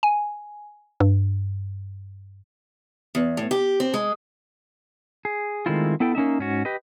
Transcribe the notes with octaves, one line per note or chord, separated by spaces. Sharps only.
G#5
G2
E2
A2
G4
C4
G#3
G#4
D#3 G#3 A3 C4 E4 F4
B3 E4 A4 G5
A#3 C#4 D#4 E5
G#2 C#4 F#4
G4 B4 D#5